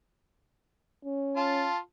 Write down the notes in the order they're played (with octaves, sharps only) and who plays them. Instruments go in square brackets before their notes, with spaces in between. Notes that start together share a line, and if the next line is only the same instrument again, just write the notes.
[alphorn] C#4
[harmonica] F4 A5